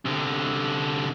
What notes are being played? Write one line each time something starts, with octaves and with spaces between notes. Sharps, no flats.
C2 D3